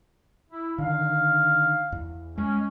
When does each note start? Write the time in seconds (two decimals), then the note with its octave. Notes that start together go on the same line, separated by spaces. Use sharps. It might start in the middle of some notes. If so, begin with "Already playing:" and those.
0.50 E4
0.78 D3 D#3 F5
1.92 E2
2.38 G#3 C#4